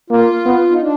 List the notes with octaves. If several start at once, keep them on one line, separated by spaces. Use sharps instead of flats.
A#3 F4
B3
D#4
D4